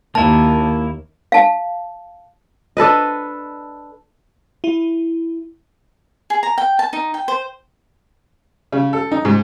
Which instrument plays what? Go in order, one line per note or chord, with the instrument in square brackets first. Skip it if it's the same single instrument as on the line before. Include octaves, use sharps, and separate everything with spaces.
[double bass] D#2 [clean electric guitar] A#3 E4 [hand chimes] A5
[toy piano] F5 A5
[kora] D4 A4 B4 D#5
[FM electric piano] E4
[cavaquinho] G#4
A#5
G5
A5
D#4
G5
C5
[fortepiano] C#3
A4
D#4
G#2